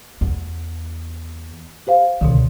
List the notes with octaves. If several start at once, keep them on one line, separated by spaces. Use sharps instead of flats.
E2
G4 C5 F5
C#2 B2 D3 D#3